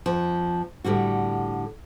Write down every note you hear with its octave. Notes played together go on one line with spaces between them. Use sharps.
F2 F3
A2 D3 G3 F#4